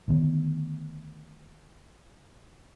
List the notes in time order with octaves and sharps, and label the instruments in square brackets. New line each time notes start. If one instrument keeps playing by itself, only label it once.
[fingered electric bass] D2 D#3 B3